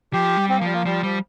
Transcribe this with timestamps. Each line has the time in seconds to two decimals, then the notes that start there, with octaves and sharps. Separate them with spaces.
0.13 F3 G4
0.37 G3
0.49 C4
0.57 A#3
0.61 F3 G3
0.73 A#3
0.85 F3 G3
1.03 F3 G3